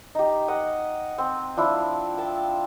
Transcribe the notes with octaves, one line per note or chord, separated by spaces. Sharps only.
D#4 G4
D#5 F#5
C4
F3 D4 E4
G5 A5